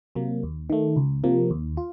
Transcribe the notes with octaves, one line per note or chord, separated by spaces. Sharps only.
C3 F#3 A#3
D#2
D#3 A3
C#2
C3 F3 A#3
D#2
F4